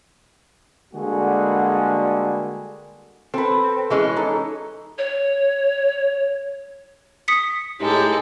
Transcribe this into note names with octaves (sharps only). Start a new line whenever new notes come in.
D3 G3 G#3 A#3 F#4 G#4
C4 A4 B4
E3 G#3 C#4
D#4 A4
C#5
D#6 B6 C#7
A2 G#3 D#4 G4 A4